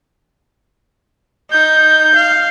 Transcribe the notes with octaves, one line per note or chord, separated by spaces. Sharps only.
D#4 G6
F5